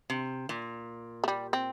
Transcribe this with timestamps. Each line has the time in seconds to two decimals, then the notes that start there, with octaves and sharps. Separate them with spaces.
0.10 C3
0.49 A#2
1.24 A3
1.28 G3
1.53 C4